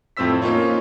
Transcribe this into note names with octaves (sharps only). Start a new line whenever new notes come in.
F2 A2 C4 C5 E6 B6
A#3 C#4 D#4 F4 C#5